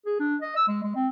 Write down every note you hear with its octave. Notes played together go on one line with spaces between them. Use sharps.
G#4
D4
D#5
E6
G#3
G#3
C4